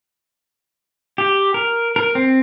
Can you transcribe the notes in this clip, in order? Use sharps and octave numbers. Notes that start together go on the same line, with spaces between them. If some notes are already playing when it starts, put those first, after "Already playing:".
G4
A#4
A#4
C4